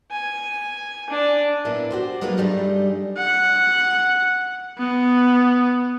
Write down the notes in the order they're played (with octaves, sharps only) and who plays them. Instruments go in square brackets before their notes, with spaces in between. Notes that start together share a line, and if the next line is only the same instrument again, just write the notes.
[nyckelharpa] G#5
D4
[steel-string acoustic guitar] A#2 A#3 B3 D4 E4 B4
F#4 G4 C5
F#3 G#3 A#3 D#4 F4 B4
G2 G3 A3 D#4 G#4
[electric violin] F#5
B3